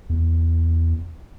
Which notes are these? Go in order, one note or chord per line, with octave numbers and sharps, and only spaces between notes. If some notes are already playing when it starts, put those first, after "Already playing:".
E2